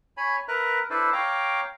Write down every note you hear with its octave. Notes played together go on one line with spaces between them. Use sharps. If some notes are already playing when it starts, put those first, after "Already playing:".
C#5 G#5 B5
A#4 B4 E5 A#5 F#6
D4 E4 A4 B4 C5 D5
C#5 F5 G5 A#5 D6